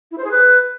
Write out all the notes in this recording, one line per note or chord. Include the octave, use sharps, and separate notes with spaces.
E4
C5
G#4
B4